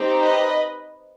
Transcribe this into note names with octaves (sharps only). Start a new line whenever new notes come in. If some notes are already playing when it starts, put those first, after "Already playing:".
Already playing: C4 D#4 G4
B4 D#5